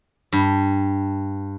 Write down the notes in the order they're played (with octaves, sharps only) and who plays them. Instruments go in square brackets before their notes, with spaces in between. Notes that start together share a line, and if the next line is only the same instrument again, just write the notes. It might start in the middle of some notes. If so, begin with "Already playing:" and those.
[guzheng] G2